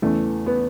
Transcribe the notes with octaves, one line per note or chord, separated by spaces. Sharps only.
E2 C#3 E3 A3
B3